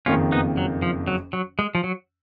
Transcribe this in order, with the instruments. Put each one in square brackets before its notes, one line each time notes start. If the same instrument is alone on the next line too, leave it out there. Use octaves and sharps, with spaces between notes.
[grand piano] F#1 F2 D#3 A#3 [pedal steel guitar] C#4 F4
[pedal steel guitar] B3 D#4
F#3
F3
F#3
F#3
G#3
F3
F#3